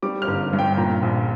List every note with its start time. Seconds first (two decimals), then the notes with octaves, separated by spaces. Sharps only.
0.02 G3 D6
0.22 F6
0.27 G1
0.53 G2
0.59 G5
0.73 G5
0.77 A#2 A#5
1.02 A#1